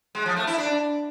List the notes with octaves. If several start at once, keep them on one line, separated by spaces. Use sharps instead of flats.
G#3
F3
A3
E4
D4